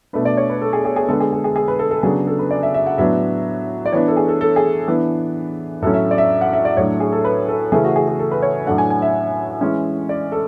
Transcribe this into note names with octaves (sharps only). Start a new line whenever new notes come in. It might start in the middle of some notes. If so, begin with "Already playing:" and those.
B2 A3 D4 B4
D5
C#5
B4
A4
G#4
G#4
G#4
D3 G#3 B3 D4 A4
G#4
G#4
G#4
G#4
B4
A4
A4
C#3 F#3 B3 D4 G#4
A4
B4
D5
E5
E5
F#5
A2 F#3 B3 D4 E5
D5
E3 B3 D4 C#5
A4
G#4
A4
A4
G#4
E3 B3 D4
A2 F#3 C#4 A4
E5
D5
E5
F#5
E5
D5
A2 F#3 A3 D4 C#5
G#4
A4
B4
A4
C#3 E3 A3 C#4 G#4
F#4
G#4
G#4
A4
B4
C#5
A2 F#3 A3 D4 F#5
G#5
G#5
E5
E3 G#3 C#4
D5
A4